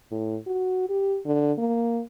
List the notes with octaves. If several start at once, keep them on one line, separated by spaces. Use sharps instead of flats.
A2
F#4
G4
D3
A#3